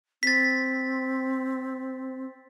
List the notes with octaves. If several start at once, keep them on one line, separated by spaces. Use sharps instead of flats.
C4 A6 B6